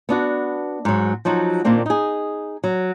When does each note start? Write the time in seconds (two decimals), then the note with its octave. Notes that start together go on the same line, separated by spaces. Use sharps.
0.09 B3 D4 F#4
0.85 G#2 F#3
1.25 F3 F#3 D#4 F#4
1.64 A#2 D#3 A#3 C4 D4
1.86 D#4 G#4
2.64 F#3